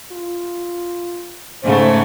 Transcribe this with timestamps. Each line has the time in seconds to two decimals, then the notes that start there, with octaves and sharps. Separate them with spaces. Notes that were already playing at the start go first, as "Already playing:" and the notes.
0.12 F4
1.63 G#2 C#3 A3 C5